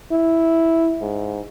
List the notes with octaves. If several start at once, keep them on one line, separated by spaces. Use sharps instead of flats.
E4
G#2